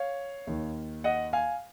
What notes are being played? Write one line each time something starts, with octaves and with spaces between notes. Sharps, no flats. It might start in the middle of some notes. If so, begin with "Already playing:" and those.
Already playing: C#5 F5
D#2 D#3
D#5 F#5
F5 G#5